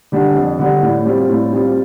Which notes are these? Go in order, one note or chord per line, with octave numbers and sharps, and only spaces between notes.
D3 G3 D4
F2
D3 G3 D4
A2
G3 C4 F4
A2
G3 C4 F4